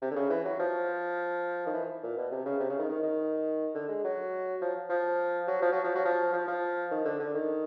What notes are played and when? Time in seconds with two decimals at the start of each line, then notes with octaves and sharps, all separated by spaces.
0.02 C3
0.11 D3
0.16 C#3
0.30 E3
0.45 F#3
0.59 F3
1.66 D#3
1.73 E3
2.03 A#2
2.17 B2
2.31 C3
2.45 C#3
2.60 C3
2.70 C#3
2.79 D#3
2.89 D#3
3.03 D#3
3.75 D3
3.89 G#3
4.04 F#3
4.61 F3
4.90 F3
5.47 F#3
5.62 F3
5.72 F#3
5.84 F3
5.95 F#3
6.05 F3
6.33 F3
6.47 F3
6.91 D#3
7.05 D3
7.20 D3
7.34 D#3